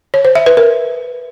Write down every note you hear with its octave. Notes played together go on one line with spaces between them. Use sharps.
C#5
C5
E5
B4
A#4